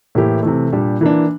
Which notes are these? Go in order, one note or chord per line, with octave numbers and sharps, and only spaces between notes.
A2 E3 A#3 E4 G4
C3 E3 A3
A#2 G3 D4 G4
E3 A#3 D4